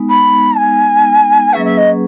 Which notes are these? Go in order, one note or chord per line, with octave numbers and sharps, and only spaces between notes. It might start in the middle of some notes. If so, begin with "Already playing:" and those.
Already playing: G#3 B3 D#4
B5
G#5
F#3 A#3 C#4 G#4 B4 E5
E5
D#5